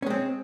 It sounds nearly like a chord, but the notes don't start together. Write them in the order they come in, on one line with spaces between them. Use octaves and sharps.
C#4 G#3 C4